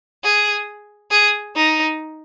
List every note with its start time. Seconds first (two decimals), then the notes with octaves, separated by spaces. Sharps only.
0.24 G#4
1.11 G#4
1.55 D#4